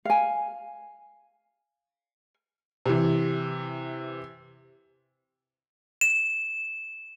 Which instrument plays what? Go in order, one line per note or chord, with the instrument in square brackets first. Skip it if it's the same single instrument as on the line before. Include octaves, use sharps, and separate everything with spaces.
[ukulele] F5 G#5
[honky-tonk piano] C3 E3
[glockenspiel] E7